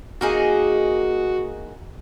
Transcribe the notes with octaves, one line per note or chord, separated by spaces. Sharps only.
A#3 D#4 F#4 G#4